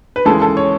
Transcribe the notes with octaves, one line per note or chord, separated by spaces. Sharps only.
B4
D#2 C#3 E3 G#3 A4
A4
C#5